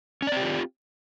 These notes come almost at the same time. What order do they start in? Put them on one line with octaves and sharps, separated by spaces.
C#4 D5 C4 G4 F4